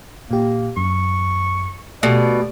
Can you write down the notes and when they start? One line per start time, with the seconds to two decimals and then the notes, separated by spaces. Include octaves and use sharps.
0.31 A#2 A#3 G4
0.77 F#2 C#6
2.03 B2 A3 G4 D5